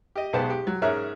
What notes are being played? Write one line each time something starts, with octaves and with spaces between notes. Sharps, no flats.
G4 D#5
B1 G#3 B3 G4 C5 A5
G4
F#3
G#2 C#4 G#4 A#4 E5 F#6